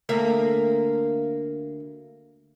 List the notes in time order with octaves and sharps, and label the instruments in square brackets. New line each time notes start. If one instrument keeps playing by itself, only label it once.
[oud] D2 A#3 E5